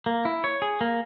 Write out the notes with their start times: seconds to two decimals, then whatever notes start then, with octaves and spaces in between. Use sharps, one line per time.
0.06 A#3
0.25 E4
0.44 C#5
0.62 G#4
0.81 A#3